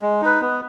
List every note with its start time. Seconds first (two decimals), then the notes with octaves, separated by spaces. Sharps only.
0.02 G#3
0.22 D#4 B4
0.41 B3